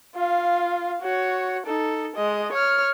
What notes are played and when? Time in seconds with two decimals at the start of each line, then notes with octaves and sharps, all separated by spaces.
0.15 F4 F5
1.02 F#4 C#5
1.66 D#4 A4
2.16 G#3 D#5
2.52 C#5 F6